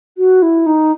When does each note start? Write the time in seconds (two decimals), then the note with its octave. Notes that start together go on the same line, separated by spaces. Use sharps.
0.18 F#4
0.42 E4
0.66 D#4